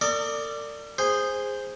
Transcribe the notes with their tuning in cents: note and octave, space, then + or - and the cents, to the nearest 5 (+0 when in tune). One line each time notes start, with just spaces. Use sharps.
A#4 -45 D5 +0 D#6 +0
G#4 -10 C5 +0